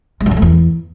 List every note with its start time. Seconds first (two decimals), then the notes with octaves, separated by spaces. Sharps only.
0.20 G#3
0.26 F#2
0.31 F#3
0.37 A3
0.42 E2